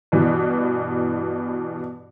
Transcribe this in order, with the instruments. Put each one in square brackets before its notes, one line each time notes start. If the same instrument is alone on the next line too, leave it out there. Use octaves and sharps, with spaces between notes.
[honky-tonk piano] G2 B2 E3